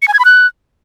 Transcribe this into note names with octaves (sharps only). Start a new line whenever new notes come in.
C#7
G#5
G#6
B5
F#6